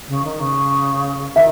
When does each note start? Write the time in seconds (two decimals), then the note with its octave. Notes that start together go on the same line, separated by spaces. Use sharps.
0.08 C#3
0.25 D#3
0.40 C#3
1.35 D#3 E5